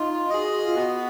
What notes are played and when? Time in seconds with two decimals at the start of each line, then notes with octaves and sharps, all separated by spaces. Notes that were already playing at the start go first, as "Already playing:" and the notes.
Already playing: D#4 F4
0.30 F#4 G#4 D#5
0.65 F4
0.76 B3 F#4